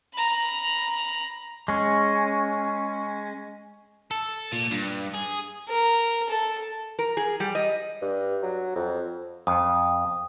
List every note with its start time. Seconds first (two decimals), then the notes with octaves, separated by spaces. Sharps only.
0.13 A#5 B5
1.68 G#3 C#4
4.11 A4
4.52 A#2
4.72 G2
5.14 G#4
5.68 A#4
6.29 A4
6.99 A#4
7.17 G#4
7.40 G3
7.55 D#5
8.02 G2
8.43 F#3
8.76 F2
9.47 F2 D#6